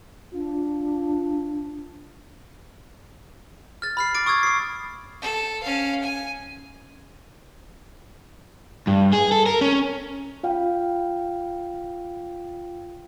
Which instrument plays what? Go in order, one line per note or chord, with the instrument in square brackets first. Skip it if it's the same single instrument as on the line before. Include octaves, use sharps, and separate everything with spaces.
[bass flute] D4 [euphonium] F4
[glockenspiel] F6 A6
B5 F6 C7
D6 A6 D7
C#6 D#6 E6 G#6
D#6 C7
[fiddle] A4
C#4 F5
G#5
[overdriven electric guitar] G2
G#4
A4
A#4
C#4
[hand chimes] F4 F5 G5